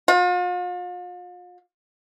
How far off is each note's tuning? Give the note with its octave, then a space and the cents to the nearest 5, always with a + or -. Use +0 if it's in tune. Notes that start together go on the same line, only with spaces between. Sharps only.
F4 +40